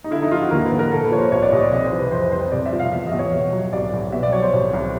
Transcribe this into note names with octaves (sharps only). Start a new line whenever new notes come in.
D#4
D3 E4
D#4
F3 F4
F#4
D#2 A#4
B4
D#2
A#4
A#2 A4
B4
F3 C#5
C5
C2 C#5
D5
C2 D#5
D5
C3 D#5
C5
E3
B4
F2 C5
G3 C5
C3 D5
E5
F3
F5
E2 E5
D#5
E2
C#5
B2
F#3
C2 D5
C2
B2 E5
D5
F#3 C#5
C5
C2
C2